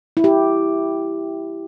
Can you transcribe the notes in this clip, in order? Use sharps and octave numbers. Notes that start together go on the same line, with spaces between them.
E4
G4